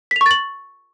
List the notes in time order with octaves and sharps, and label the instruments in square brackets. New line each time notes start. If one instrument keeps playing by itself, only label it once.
[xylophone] B6
F7
C#6
A6
F#7